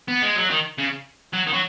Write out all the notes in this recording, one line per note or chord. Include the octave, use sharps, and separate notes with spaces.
B3
G#3
F#3
D#3
C#3
F#3
D#3
F#3